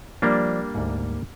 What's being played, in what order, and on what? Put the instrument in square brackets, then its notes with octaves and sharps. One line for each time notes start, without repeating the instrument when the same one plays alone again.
[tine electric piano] F3 D5 [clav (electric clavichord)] G3 A#3 D4
[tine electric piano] D2 G#2